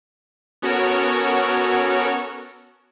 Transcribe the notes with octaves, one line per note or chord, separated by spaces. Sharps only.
B3 C#4 F#4 A4 A#4 C#5